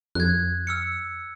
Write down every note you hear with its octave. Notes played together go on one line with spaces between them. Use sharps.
F2 F#6 G#6
E6 F6 C#7